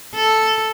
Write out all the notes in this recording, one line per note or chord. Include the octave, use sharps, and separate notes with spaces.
A4